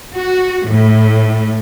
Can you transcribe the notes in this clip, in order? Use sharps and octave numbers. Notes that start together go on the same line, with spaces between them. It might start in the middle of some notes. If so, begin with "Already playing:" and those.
F#4
A2